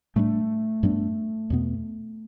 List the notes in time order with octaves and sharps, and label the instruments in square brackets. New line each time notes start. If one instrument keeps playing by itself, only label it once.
[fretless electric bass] A2 G3 D4 [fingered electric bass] A3
[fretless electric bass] G2 G3 B3 D4
E2 B2 B3